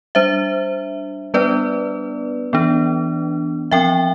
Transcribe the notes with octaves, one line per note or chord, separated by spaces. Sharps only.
G3 D4 C5 E5
G3 B3 D4 B4 D5
E3 B3 D4
F3 C4 E5 G5